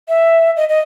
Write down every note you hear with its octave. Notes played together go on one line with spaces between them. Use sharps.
E5
D#5
D#5